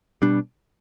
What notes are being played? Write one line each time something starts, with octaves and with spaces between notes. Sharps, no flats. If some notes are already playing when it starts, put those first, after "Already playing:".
B2 G3 D4